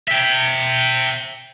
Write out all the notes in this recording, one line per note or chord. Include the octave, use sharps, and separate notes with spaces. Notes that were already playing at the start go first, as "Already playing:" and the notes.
E5 G5